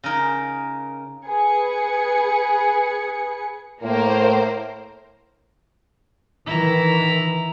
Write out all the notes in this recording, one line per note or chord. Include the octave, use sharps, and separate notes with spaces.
C#3 D#4 A#4
G#4 B4 C#7
A2 A#3 A#4 C5
D#3 E3 E4 A#5